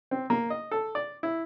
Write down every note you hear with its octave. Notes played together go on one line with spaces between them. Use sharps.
C4
A#3
D#5
A4
D5
E4